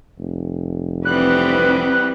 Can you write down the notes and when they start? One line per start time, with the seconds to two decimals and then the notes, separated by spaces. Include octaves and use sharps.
0.18 F1
1.05 E3 G3 B3 C4 B4 F#6